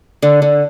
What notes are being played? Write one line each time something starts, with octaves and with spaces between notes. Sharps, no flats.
D3
D3